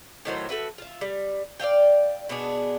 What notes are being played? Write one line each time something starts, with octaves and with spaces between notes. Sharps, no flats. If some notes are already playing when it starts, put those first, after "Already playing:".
A2 D#3 F#3 C5
A3 F#4 B4 E5
F4 E5
G3
D5 E5 F5 G5
B2 B3 D4 G#4